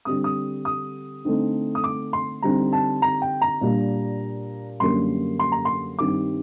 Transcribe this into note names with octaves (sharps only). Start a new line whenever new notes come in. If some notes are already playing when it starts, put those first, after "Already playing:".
D3 G3 C4 D#6
D#6
D#6
D3 A3 C4 D#4
D#6
D6
C6
D3 G3 C4 D#4 A#5
A5
A#5
G5
A#5
A#2 G3 D4
F#2 D3 G3 A#3 C6
C6
A#5
C6
G2 D#3 G3 C4 D6